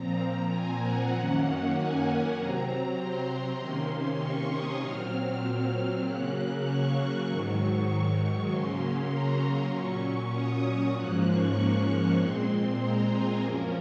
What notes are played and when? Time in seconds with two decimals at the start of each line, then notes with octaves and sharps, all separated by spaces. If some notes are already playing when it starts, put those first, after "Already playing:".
Already playing: A#2 F3 C4 A#5
0.50 G#5
0.82 F#5
1.12 F#2 D#3 A#3 C#4 F#5
1.73 G#5
2.36 C3 F#3 C4 A#5
2.97 C6
3.57 C3 D#3 A#3 C#4 C6
4.19 C#6
4.50 D#6
4.81 A#2 F#3 C4 F6
5.41 F6
6.03 C#3 F#3 A#3 C#4 F#6
6.33 F#6
6.65 C#6
7.26 G#2 D#3 F#3
8.48 C#3 F#3 A#3 C#4 C6
9.10 A#5
9.71 A#2 F#3 C#4 C#6
10.32 D#6
10.94 G#2 F3 A#3 C#4 F#6
11.25 C#6
12.17 A#2 G#3 C4 C6
12.78 A#5
13.09 G#5
13.39 F#2 F3 A#3 C#4 A#4